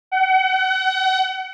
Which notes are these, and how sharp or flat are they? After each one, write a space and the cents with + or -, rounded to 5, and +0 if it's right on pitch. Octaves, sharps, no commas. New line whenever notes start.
F#5 +35